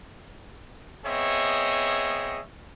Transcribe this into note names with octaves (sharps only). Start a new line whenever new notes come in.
B3 C4 G#4 C#5 D#5 E5